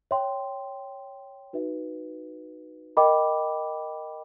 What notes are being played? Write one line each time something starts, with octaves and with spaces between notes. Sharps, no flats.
C#5 E5 G5 C6
D#4 F#4 B4 E5
A#4 D#5 G5 B5 D6